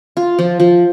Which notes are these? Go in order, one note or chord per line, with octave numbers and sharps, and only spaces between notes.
F4
F3
F3